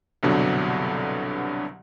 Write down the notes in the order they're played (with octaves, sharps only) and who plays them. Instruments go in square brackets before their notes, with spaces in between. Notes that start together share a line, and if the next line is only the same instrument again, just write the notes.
[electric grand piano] C2 G2 B2 D3 F#3